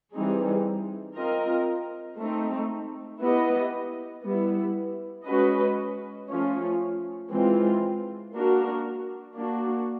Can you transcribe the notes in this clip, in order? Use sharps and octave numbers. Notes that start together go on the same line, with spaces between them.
E3 G3 C4 D#4 G#4
C4 F4 A#4 D#5
A3 C4 D#4
B3 E4 G4 B4 D#5
G3 B3 E4
G#3 C#4 F#4 B4 D#5
F3 A3 C#4 F4
E3 G#3 C4 F4
A#3 D4 F#4 A#4
A#3 D4 F#4